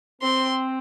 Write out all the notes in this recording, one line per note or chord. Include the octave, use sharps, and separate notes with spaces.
C4 C6